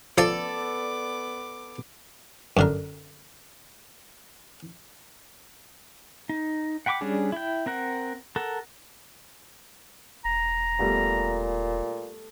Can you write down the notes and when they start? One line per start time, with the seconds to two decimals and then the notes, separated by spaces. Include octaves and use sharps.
0.18 F3 B3 A4 D5 D6
2.57 F#2 D3 A#4
6.29 D#4
6.86 F#5 G5 B5 C#6 D6
7.01 G3 C#4 D4 G#4
7.32 E4 G5
7.66 C4 A#4 F#5
8.36 A4 A#4 F#5
10.25 E1 A#5
10.79 A#2 G3 A3 B3